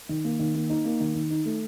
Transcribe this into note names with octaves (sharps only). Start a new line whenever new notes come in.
D#3
A#3
D#3
A#3
D#4
A#3
D#3
D#3
D#4
A3